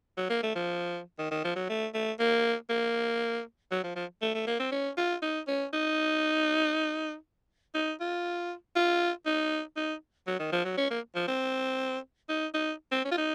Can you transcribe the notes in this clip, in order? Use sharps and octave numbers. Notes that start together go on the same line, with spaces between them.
F#3
A#3
A3
F3
D#3
D#3
F3
F#3
A3
A3
A#3
A#3
F#3
F3
F3
A3
A3
A#3
C4
C#4
F4
D#4
C#4
D#4
D#4
F4
F4
D#4
D#4
F#3
D#3
F3
F#3
C#4
A#3
F3
C4
D#4
D#4
C4
C#4
F4
D#4